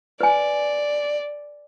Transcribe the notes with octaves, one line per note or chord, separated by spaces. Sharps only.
B4 D5 G#5